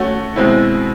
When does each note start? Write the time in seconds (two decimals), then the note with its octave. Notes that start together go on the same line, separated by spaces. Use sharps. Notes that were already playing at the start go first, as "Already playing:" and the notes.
Already playing: A3 C#4 F#4
0.36 B2 G#3 C4 E4